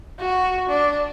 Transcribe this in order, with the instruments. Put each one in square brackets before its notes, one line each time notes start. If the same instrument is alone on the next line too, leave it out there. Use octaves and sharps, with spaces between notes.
[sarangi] F#4
D4